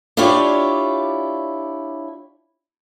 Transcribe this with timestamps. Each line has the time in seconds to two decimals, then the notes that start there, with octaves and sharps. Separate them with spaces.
0.17 D4 E4 F4 G4 C#5 D5